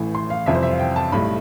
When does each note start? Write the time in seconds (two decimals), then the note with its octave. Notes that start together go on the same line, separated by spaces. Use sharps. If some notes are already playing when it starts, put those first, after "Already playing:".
Already playing: A1 A2 E3
0.15 C6
0.30 F5
0.46 F2 C3 E3 G3 E5
0.55 C5
0.63 E5
0.72 F5
0.79 G5
0.96 A5
1.12 B1 A2 G3 B5